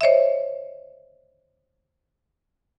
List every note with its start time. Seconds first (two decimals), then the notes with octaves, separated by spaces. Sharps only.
0.01 C5 C#5 D#5 E5